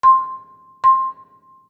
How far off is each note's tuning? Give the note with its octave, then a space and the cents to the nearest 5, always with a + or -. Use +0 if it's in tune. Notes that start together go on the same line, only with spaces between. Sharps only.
C6 +10
C6 +15